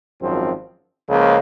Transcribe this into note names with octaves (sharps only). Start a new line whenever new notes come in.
G#1 F#2 F3 C4
C#2 C#3 F3 A#3